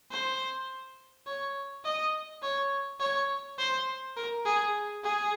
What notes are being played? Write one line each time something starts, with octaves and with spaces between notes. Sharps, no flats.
C5
C#5
D#5
C#5
C#5
C5
A#4
G#4
G#4